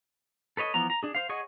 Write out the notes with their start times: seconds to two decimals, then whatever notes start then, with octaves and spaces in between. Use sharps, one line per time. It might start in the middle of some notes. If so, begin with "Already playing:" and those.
0.57 A4 B4 C#5 D#5
0.74 E3 F3 B3 A#5
0.90 A#5
1.03 D4 G#4
1.15 C5 F5
1.29 G#4 C#5 D#5 F#5 C#6